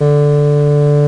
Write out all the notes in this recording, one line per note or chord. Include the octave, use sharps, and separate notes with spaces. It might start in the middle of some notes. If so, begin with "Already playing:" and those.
D3